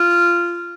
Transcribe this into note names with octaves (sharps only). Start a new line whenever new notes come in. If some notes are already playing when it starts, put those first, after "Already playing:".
Already playing: F4